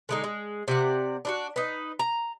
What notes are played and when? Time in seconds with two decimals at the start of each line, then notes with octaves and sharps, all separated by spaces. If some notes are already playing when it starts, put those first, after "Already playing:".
0.09 D3 G#3 D#4
0.24 G#3
0.68 C3 D5 F#5
1.25 D4 F4 F#4
1.56 D#4 B4
1.99 A#5